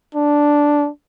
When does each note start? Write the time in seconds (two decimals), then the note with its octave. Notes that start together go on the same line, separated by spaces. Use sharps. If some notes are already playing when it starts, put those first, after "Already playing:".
0.15 D4